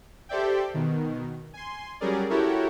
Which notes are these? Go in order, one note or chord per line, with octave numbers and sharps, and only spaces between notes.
G4 A4 C5 D5 E5 G5
B2 D#3
G#5 C6
F#3 G3 C#4 G#4 A#4 D5
E4 F#4 G4 A4 A#4 C#5